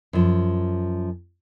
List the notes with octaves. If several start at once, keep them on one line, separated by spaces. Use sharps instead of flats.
F#2 F3